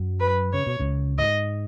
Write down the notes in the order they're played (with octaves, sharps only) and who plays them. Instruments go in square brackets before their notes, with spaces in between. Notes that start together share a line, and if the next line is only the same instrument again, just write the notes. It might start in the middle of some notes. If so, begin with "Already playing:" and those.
Already playing: [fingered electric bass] F#2 F#3
[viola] B4
[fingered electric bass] C#3 [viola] C#5
[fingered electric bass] B2
C#2 C#3
[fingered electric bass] G#2 [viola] D#5